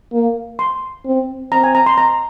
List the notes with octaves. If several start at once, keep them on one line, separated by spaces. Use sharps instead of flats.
A#3
C6
C4
C4 A#5
G#5
A#5
C6
A#5